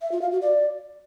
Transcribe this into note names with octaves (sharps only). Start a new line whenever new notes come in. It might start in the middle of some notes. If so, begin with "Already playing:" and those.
E5
F4
F5
F#4
D5